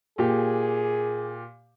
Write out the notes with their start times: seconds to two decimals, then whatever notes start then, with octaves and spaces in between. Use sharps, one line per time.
0.18 A#2 G4 G#4